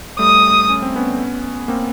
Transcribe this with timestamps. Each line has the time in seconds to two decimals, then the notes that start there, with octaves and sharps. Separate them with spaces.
0.19 G3 A3 D#6
0.69 C#4
0.82 C4
0.96 B3 C#4
1.68 A#3 C4